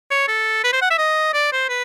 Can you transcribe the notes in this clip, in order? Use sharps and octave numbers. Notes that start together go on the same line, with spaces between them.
C#5
A4
B4
C5
F#5
E5
D#5
D5
C5
B4